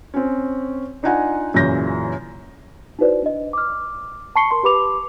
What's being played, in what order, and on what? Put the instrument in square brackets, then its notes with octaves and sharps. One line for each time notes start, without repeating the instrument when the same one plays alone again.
[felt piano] C4 C#4
D4 D#4 F4 F#5 G#5 A#5
F#2 A#2 C#3 E3 G6 A#6
[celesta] D#4 E4 F#4 B4 C5 D5
D4 D#5
D6 F6
A5 B5 C#6 C7 C#7 G7
A#4 C6
G4 B4 B5 D6 F7